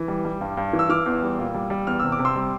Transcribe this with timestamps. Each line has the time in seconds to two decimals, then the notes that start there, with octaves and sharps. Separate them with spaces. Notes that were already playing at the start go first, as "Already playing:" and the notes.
Already playing: E3
0.08 G3
0.25 G3
0.41 G2
0.57 G2
0.73 E3
0.79 E6
0.89 E3 D6 F6
1.06 E2
1.22 G3
1.38 A#2
1.54 G3
1.70 G3
1.87 E2 F6
1.99 C3 E6
2.12 D6
2.19 C3
2.25 C6 E6
2.35 G3